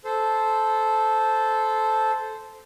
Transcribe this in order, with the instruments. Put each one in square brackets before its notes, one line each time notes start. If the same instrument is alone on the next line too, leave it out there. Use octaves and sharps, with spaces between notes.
[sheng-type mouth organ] A4 C5